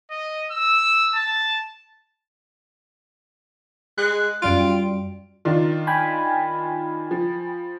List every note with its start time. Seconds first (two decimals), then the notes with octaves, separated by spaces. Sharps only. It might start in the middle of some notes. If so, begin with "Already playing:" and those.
0.11 D#5
0.51 E6
1.15 A5
3.98 G#3 F#6
4.42 F#2 G3 F4 D7
5.45 D#3 D4 F4
5.87 G5 G#5 B5
7.11 F3